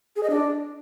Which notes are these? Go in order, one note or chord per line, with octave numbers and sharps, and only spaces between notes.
G#4
D#5
D4